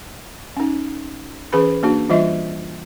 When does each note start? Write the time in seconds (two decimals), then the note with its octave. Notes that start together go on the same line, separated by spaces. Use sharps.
0.57 C#4 D#4
1.53 E3 C#4 G#4 B4 B5
1.83 A#3 D4 F#4
2.10 E3 G3 F4 D#5 E5